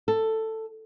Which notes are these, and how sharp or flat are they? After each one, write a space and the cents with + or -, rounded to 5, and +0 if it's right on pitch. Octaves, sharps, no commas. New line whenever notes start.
A4 +10